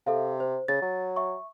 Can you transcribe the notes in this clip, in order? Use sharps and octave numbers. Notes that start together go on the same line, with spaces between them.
C3 A4 E5 F5
C5
C#3 A6
F#3
E5 C#6